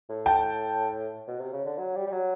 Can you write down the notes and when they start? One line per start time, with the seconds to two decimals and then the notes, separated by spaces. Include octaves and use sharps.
0.09 A2
0.26 G5 A5
1.28 B2
1.40 C3
1.53 C#3
1.66 D3
1.78 F#3
1.95 G3
2.07 G3
2.12 F#3